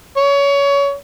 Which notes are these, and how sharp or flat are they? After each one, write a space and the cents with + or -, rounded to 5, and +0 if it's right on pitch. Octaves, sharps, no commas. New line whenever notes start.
C#5 +25